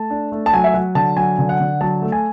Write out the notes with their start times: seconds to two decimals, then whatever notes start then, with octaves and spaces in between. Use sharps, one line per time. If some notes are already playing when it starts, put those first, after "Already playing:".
Already playing: A3 A5
0.10 D4
0.32 A3
0.46 A5
0.53 F#3 G#5
0.64 E5
0.74 F#3 F#5
0.95 D3 A5
1.16 F#3 G#5
1.39 D3
1.49 F#5
1.60 D3
1.81 F#3 A5
2.02 A3
2.12 G#5